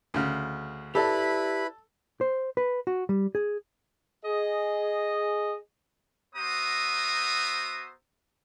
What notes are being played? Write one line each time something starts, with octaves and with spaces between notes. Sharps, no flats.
D2 C#3
E4 G4 A4 B4 D5 A5 B5
C5
B4
F#4
G3
G#4
G#4 D#5
B3 F#4 C5 E5 A#5 D#6